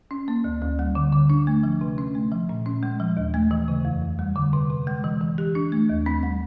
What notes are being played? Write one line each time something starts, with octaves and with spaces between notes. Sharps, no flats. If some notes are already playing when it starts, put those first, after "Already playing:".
C#4
A#3
D2
D2
G3
D3
D3
D4
A3
F3
C3
C#4
A3
F3
A#2
C#4
G#3
F3
D#2
A3
E3
C#3
F2
F2
G3
D3
C3
C3
G#3
E3
E3
G4
D4
A3
D#2
C4
G3